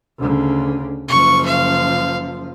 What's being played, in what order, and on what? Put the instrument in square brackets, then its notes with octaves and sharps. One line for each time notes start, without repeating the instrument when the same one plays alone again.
[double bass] D2 C#3
[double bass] F#1 F3 [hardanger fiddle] C#6
[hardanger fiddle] F5